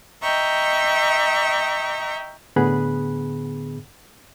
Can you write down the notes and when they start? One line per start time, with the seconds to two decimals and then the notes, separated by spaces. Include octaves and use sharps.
0.22 D#5 E5 G5 A#5 C#6
2.56 A2 D3 B3 G#4 B5 F#6